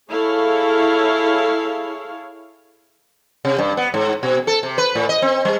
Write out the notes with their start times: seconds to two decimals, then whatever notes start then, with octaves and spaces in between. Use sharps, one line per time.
0.10 E4 G#4 A4 C#5 F5
3.45 C3
3.58 G2
3.77 B3
3.94 G#2
4.23 B2
4.47 A4
4.63 C3
4.78 B4
4.95 A2
5.09 D#5
5.22 C4
5.45 G3